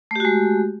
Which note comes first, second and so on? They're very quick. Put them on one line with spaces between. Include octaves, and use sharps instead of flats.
A3 G4 F#4 G#3